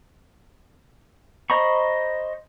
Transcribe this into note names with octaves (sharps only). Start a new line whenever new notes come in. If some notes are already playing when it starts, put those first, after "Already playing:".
C5 D#5 A#5 B5 C#6